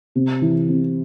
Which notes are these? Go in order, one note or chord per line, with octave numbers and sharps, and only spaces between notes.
C3
E3
C3